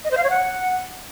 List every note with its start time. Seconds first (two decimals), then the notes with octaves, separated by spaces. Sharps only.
0.05 D#5
0.11 C5
0.17 F5
0.24 C#5
0.30 F#5